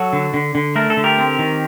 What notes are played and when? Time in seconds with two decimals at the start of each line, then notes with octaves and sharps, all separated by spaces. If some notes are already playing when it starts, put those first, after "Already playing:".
Already playing: F#3 F#4 A4
0.13 D3
0.34 D3
0.55 D3
0.76 A3 A#4
0.90 A4
0.97 D3
1.04 G4 A#4
1.18 C4
1.39 D#3